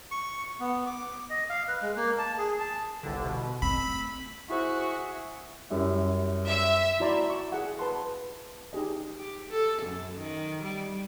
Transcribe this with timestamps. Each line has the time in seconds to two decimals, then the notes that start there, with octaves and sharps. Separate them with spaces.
0.11 C#6
0.60 B3
0.86 D6
1.30 D#5
1.50 F5
1.68 B4
1.82 G#3
1.96 A#3
2.19 A5
2.38 G#4
2.60 A5
3.03 G1 C2 D3
3.25 B2
3.62 A3 C4 B5 E6 B6
4.50 E4 F#4 G#4 C5 E5 C#6
5.70 F#2 G3 E4
6.47 E5
7.00 E4 F#4 D5 A#5 C6
7.30 C#6 D6
7.52 G#4 F#5
7.79 B4 A5 C6
8.73 D#4 G4 G#4 D#5
9.19 G4
9.49 A4
9.82 F#2
10.18 D#3
10.62 G3